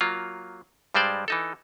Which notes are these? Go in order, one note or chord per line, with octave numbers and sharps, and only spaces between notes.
F#3 A#3 F4
G2 G3 G#3 C5 D5
E3 D#4 A4